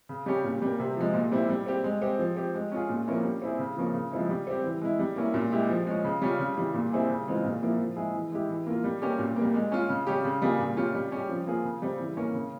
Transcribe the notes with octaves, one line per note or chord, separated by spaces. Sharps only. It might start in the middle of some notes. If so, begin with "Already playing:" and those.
C#3
G3 C#4 G4
A#2
G3 A#3
C3
F3 G#3
A#2
G3 C4 E4
G3
C4 G4
G#3
C4 G4
F3
C4 G4
G#3
C#4 F4 G#4
A#2
F3 A#3 C#4 E4
G3
C4 E4 G#4
C#3
F3 A#3 C#4
C#3
F3 G#3 C4 E4
G3
C4 G4
E3
G#3 E4
G3
A#3 C#4 E4
A#2
G#3 E4 G4
F3
G#3 C#4
C#3
G3 C#4 F4
C#3
E3 G3
A#2
G3 C4 E4 G#4
C#3
E3 G#3 C4 F4
A#2
F3 A#3 E4
F3
G#3 E4 G#4
E3
G#3 E4 G4
E3
A#3 F4
G3
A#3 C#4 G4
A#2
G3 A#3
G#3
C#4 F4
C#3
G3 C#4 G4
C#3
G3 A#3 F4 G#4
A#2
G3 C#4 F4
G3
C#4 G4
F3
A#3 F4 G#4
C#3
G3 C4
E3
A#3 C#4
C#3